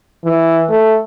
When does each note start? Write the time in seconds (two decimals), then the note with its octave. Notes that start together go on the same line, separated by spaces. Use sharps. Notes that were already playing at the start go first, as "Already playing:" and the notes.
0.24 E3
0.69 A3